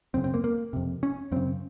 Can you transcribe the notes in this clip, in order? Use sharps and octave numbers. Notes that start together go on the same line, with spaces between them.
F#2 C#3 C4
C4
A#3
A#3
F2 C3
C#4
F#2 C#3 C4